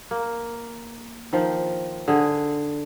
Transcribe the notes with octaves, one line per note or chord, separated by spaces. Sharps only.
A#3
D#3 F3
D3 G#4